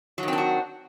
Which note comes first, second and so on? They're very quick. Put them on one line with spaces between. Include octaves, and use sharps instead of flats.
F#3 D#3 C4 D4 F#4